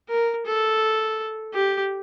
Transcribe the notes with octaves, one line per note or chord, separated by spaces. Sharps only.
A#4
A4
G4